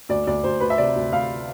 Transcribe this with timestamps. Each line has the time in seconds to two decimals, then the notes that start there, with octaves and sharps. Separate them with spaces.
0.09 D2 D5
0.27 D2 D5
0.44 D2 C5
0.60 D2 B4
0.70 E5
0.78 C3 D5
0.96 D2
1.12 D2 F5